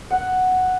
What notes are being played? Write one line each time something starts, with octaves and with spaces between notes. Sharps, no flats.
F#5